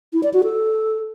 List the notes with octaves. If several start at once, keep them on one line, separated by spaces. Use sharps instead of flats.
E4
D5
F#4
A4